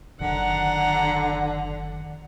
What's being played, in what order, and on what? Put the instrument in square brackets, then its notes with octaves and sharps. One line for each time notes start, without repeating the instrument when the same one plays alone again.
[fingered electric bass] F#1 D#3 [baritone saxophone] D3 [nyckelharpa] F#5 A#5